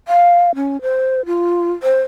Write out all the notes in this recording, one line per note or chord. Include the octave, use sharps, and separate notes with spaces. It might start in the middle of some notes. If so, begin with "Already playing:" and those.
F5
C#4
C5
F4
C5